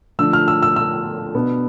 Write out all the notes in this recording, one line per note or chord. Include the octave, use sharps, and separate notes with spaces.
D3 F3 A3 D4 E6
F6
E6
E6
E6
B2 B3 D4